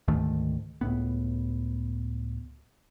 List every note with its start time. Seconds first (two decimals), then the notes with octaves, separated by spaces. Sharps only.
0.08 D2 G#2 D#3 A3
0.81 C#2 A2 B3